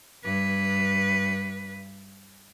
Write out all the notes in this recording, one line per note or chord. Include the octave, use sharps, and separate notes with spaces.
G2 B4